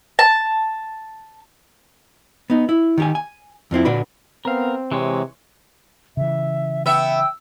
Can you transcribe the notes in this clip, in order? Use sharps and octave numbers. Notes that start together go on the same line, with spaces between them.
A5
B3 D#4
E4
D#3 G4 G#5
G#5
F2 F3 C4 E4
A#2 D3 D4 F#4 B4 B5
B3 C4 A#4 F5
C3 E3 G#3 C#5
C#3 E3 E5
B3 E5 G5 E6